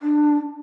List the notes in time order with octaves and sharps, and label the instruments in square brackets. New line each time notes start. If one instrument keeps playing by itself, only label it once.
[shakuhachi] D4